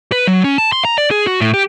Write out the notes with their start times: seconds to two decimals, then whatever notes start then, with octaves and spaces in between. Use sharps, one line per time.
0.12 B4
0.27 F#3
0.44 C#4
0.58 A5
0.72 C6
0.85 A#5
0.98 D5
1.11 G#4
1.27 F#4
1.41 A2
1.54 G4